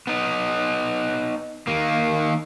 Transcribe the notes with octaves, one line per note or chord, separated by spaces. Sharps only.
B3 D#4
D#3 A#3